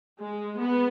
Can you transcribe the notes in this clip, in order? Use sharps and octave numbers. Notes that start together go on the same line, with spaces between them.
G#3
B3